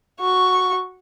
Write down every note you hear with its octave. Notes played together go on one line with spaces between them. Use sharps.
F#4 C#6